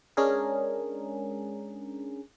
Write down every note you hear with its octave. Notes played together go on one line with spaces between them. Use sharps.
G#3 C#4 D4 G#4 A#4